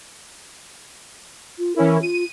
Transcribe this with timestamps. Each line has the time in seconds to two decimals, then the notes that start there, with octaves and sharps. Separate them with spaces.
1.59 F4
1.76 E3 C#4 E4 A#4
2.02 F4 D#7